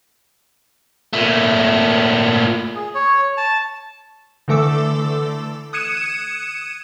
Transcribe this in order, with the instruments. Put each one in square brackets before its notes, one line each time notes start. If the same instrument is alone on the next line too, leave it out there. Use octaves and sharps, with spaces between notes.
[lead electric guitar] A#2 A3
[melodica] G#4
C#5
A5
[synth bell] D3 E3 A3 A4 D6 E6
D#6 F#6 G#6 C#7 D#7 E7